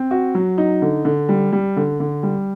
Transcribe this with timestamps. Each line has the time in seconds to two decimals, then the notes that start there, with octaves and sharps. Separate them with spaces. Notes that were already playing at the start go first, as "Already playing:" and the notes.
Already playing: C4
0.11 F#4
0.35 F#3
0.58 D#4
0.82 D3
1.05 D3
1.29 G3
1.53 G3
1.77 D3
2.00 D3
2.23 G3